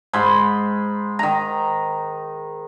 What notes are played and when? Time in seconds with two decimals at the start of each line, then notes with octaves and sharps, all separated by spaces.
0.13 G#2 B5 C6
1.19 D#3 A#5